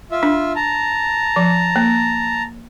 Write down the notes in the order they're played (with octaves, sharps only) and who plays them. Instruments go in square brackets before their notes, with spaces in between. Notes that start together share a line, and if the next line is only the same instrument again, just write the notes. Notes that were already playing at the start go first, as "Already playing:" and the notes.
[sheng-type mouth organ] F4 E5
[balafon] D4
[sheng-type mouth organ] A5 A#5
[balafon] F3
A#3